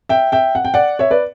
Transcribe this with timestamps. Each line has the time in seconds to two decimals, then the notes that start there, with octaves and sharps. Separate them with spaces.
0.09 E5 G5
0.32 E5 G5
0.55 F#5
0.65 G5
0.74 D5 F#5
0.99 C#5 E5
1.11 B4 D5